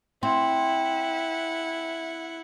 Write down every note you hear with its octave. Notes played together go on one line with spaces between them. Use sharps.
C4 E4 F#5